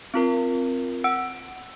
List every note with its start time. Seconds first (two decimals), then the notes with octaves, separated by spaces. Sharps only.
0.14 C4 F4 A#4
1.04 F#5 E6 C#7 D7